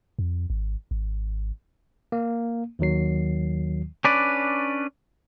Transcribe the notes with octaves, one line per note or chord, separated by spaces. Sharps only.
F2
G#1
G#1
A#3
D#2 D#3 F#3 C7
C#4 D4 B4 D5